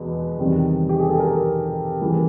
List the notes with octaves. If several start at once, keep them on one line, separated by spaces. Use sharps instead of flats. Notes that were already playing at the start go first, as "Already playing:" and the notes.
Already playing: E2 B2 G#3 B4
E2 C3 D#3 G3
G4
G#4
A4
A#4
C#3 E3 A#4